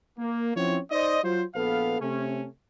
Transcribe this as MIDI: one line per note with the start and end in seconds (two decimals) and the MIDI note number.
0.19 0.53 58
0.56 0.79 53
0.56 0.79 60
0.56 0.79 61
0.56 0.79 64
0.56 0.79 66
0.56 0.79 73
0.91 1.19 63
0.91 1.19 72
0.91 1.19 74
0.91 1.19 75
1.24 1.43 54
1.24 1.43 65
1.24 1.43 72
1.55 1.98 34
1.55 1.98 59
1.55 1.98 69
1.55 1.98 71
1.55 1.98 77
2.01 2.47 48
2.01 2.47 57
2.01 2.47 61